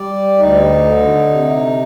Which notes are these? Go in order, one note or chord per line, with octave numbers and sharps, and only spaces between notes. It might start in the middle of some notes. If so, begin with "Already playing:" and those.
Already playing: G3 D5
D2 D#4
D3
C3